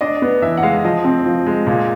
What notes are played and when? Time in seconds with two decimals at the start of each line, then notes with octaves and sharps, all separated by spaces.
0.01 D4 D#5
0.22 B3
0.42 E3 E5
0.57 F#5
0.63 G#3 F5
0.84 F3 D#5
1.04 C4
1.26 F3
1.46 G#3
1.67 A#2